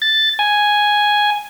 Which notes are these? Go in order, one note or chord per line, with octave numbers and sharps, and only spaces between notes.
A6
G#5